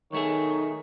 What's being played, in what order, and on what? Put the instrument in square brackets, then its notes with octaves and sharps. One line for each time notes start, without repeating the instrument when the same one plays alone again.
[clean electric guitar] B1 A3 G#4 [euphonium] D#3 [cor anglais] C#5